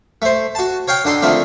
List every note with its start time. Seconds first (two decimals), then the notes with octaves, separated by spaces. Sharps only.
0.22 A3 C5
0.55 F#4 A5
0.88 C#5 F5 G5
1.05 D3 D#4 A4 C6
1.22 D3 D#3 F3 A3 C4